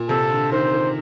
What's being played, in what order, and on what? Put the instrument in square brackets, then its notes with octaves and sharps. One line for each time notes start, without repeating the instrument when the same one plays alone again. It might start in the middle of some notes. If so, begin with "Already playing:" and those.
Already playing: [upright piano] A#2
[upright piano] C3 [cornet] A4
[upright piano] D3
[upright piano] D#3 [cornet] C5
[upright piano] D#3